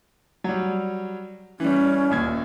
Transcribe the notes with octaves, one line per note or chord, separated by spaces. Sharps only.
F#3 G3
E3 G3 C#4
D#1 D#2 G#6